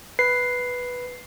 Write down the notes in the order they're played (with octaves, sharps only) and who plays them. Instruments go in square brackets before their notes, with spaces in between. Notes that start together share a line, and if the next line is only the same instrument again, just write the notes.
[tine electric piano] B4 [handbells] C7